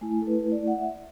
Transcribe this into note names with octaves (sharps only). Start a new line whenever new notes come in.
A3 E4 G#5
A4
B4
D5
F#5
E5